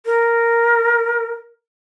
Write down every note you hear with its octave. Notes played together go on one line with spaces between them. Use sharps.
A#4